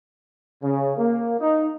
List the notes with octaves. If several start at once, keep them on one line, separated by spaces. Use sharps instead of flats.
C#3
A#3
D#4